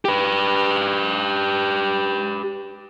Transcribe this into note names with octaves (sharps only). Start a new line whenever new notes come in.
G4 B4